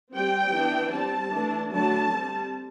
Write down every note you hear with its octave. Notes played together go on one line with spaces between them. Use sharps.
G3 C4 G5
E3 B3 D4
G3 C4 A5
E3 A3 D4
D3 F#3 A3 D4 A5
G3 C4